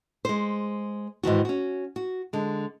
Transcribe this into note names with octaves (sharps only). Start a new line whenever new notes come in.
G#3 C5
G#2 D#3 E3 F#4
C#4 F#4
F#4
D3 G#3